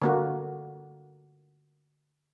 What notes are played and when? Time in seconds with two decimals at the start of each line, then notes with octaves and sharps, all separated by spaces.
0.02 D3 A#3 F#4